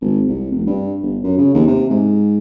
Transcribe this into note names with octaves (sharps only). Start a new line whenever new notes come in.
G#1
C2
F1
G2
G1
F#2
C#3
D#2
C3
G#2